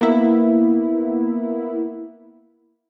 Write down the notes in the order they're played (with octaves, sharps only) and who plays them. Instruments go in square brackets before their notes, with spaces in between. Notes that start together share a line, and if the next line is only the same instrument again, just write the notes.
[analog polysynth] A#3 B3 E4